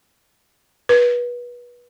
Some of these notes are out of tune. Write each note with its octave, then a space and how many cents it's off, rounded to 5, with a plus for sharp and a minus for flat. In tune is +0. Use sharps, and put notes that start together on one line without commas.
B4 -25